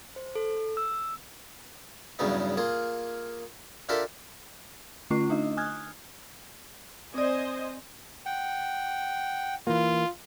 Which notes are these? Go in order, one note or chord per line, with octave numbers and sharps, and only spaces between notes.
C5
A4
E6
E2 G2 C#3 F#3 B3 D#4
A#3 F4 G#4
D4 F4 G4 A4 A#4 E5
D3 A3 C#4 F4 C#6 C7
A3 D4 D#4 D#5
G#5 D#6 F6 F#6 G#6
C4 C5 D5 D#5 G#5
F#5 G5
E3 A#3 F4